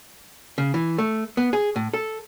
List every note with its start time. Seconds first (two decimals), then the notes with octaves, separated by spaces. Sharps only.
0.58 C#3
0.74 E3
0.98 A3
1.37 B3
1.53 G#4
1.76 A2
1.94 A4